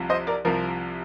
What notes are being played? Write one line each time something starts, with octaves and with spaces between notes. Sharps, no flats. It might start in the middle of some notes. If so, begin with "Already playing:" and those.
Already playing: C2 C3 F3
C5 D#5
A#4 D5
C2 C3 F3 A#4